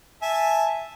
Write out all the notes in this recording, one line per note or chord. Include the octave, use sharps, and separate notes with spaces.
E5 G#5 A5